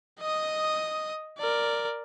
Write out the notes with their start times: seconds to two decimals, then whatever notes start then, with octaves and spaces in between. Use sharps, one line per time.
0.20 D#5 D#6
1.38 A#4 D5